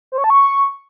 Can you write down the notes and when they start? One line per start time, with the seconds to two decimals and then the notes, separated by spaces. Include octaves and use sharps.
0.12 C5
0.18 C#5
0.24 A5
0.30 C#6